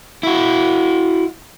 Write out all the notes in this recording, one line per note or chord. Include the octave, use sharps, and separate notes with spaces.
E4 F#4